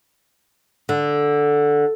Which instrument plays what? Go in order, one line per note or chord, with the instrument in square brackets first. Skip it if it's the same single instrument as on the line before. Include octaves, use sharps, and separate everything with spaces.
[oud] D3